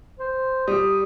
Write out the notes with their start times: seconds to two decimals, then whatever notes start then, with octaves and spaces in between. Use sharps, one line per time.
0.20 C5
0.68 G3 D#6